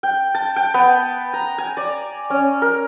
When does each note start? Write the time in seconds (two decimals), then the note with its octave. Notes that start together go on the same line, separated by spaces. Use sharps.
0.03 G5
0.34 A5
0.56 G5
0.74 B3
1.33 A#5
1.58 G#5
1.77 D5
2.30 C#4
2.62 A#4